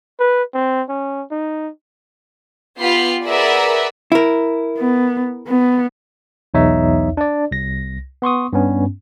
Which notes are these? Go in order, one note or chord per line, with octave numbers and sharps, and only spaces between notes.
B4
C4
C#4
D#4
B3 F4 G4 B5 C7
G#4 A#4 B4 D5 E5 F#5
E4 A#4
B3
B3
B1 E2 D#4 C#5 E5
D4 D5
C2 A#6
B3 C6 C#6 D#6
G2 B3 C#4